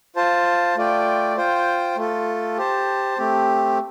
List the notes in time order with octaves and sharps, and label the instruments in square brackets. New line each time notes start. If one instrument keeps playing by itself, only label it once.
[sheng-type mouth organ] F4 C5 A5
A3 F4 D5 G5
F4 C5 G5
A3 F4 A4
G4 C5 A5
A3 C4 G4